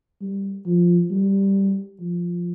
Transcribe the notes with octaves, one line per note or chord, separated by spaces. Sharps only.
G3
F3
G3
F3